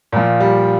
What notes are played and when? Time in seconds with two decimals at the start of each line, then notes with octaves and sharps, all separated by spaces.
0.12 A#2 F3
0.40 G3